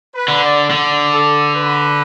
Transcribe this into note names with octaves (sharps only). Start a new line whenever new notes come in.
B4
D3
D5
D3
A4
B4